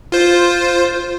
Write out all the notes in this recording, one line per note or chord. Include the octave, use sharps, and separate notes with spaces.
F4 C5